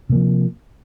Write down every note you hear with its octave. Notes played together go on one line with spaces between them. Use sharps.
C3 F3 A#3